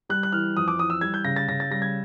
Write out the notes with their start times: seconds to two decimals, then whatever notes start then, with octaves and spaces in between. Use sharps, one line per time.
0.09 G3 F#6
0.23 F#6
0.32 E3 F6
0.56 F2 D#6
0.68 D6
0.79 E3 D#6
0.90 E6
1.01 G3 G#6
1.14 G6
1.25 C#3 A#6
1.36 A6
1.48 C#3 A#6
1.60 A6
1.71 G3 A#6
1.82 G#6